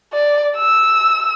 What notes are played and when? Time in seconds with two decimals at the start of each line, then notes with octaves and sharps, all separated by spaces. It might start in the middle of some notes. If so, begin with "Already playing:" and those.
0.13 D5
0.56 E6